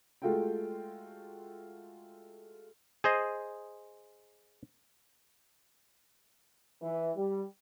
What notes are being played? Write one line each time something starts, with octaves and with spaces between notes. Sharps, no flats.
G#3 A3 F4 F#4 A4 G5
G#4 C5 D#5
E3
G3